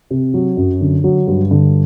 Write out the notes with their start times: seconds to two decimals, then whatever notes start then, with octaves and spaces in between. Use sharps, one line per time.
0.11 C3
0.34 F#3
0.57 F#2
0.81 D3
1.04 F#3
1.27 G2
1.51 D3